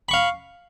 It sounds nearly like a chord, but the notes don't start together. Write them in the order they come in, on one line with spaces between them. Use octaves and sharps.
B5 C#6 F5